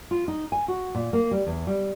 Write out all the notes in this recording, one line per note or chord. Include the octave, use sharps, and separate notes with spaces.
F4
D#4
G#5
F#4
A#2
A#3
G3
E2
G3